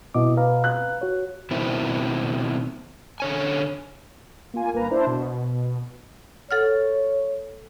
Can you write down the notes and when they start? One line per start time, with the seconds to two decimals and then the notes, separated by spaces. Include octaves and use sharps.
0.14 B2 E4 D#5 D6
0.37 B4 F5 A#5
0.64 F#6
1.01 F#4 C#5
1.51 B2 D#3 C4 E4
3.20 D3 C#5 G#5
4.54 A#3 F4 G#5
4.73 G1 A#3 B4 A#5
4.91 D4 E4 C5
5.06 B2
6.51 A4 C#5 F#5 F6